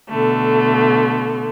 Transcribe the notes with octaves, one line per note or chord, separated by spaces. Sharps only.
B2 D3 A3